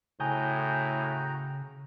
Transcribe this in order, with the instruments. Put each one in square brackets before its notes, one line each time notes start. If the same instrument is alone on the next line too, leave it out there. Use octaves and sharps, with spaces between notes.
[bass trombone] A2 [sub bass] C#3 [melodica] F#4 G5 A#5 [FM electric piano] G#5 D#6 G6